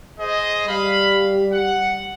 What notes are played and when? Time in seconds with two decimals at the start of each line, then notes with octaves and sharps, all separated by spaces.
0.19 G#4 C5 D#5
0.67 G3 F5 B5
1.52 F#5